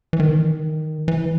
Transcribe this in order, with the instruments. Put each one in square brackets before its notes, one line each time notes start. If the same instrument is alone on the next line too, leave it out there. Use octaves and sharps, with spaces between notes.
[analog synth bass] E3
D#3
E3